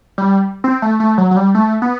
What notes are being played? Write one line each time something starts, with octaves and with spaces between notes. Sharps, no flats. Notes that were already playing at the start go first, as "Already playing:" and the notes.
G3
C4
A3
A3
F#3
F#3
G3
A3
B3